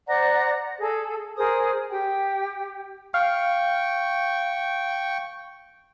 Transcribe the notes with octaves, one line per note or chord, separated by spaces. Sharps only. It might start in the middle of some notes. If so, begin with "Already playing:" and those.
C5 D5 F#5 A#5
G#4 A4
G#4 A#4 C5 D#6
G4 G5
F5 G5 C#6